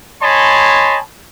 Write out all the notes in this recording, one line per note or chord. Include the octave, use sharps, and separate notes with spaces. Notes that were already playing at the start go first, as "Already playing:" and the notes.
C#5 D#5 G#5 A5 B5 C6